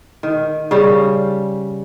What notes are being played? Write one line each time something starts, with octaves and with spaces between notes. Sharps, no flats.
D#3
C#3 G3